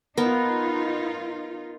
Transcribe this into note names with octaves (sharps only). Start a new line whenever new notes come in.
B3 D#4 F4 A#4